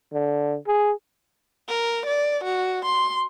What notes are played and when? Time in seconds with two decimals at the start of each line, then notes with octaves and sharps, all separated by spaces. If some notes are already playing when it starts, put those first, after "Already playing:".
0.13 D3
0.67 G#4
1.68 A#4
2.06 D5
2.44 F#4
2.85 C6